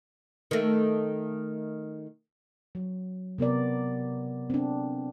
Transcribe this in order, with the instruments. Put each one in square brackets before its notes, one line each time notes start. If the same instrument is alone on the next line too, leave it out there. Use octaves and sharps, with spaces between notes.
[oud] D#3 A3
[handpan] F#3
C3 B3 A#4 D5
C4 D4